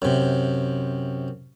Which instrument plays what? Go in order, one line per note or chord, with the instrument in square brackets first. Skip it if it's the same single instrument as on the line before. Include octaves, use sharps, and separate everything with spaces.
[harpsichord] F#2 C3